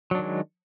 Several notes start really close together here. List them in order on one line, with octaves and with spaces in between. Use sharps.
F#3 D4 D#3 G#3